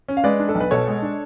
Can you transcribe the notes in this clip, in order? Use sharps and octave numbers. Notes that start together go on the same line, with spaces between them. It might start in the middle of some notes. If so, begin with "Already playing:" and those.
C#4
F5
G#3 B4 D5
D4
A4
B1
B4
B2 A4 C#5
G#3
D4